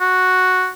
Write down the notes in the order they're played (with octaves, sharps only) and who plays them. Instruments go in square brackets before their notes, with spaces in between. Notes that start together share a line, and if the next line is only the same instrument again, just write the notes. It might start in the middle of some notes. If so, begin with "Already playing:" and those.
[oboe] F#4